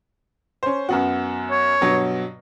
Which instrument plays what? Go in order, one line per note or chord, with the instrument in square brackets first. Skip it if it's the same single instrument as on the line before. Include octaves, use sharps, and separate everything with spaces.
[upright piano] C#4 C5
F#2 B3 F#4
[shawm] C#5
[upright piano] G2 B2 F#3